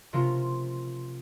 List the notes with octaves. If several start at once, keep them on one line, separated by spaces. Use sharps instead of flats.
C3 F3 A#3 C#4 F4